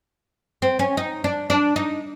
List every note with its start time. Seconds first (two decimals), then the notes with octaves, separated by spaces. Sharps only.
0.62 C4
0.79 C#4
0.97 D#4
1.24 D4
1.50 D4
1.76 D#4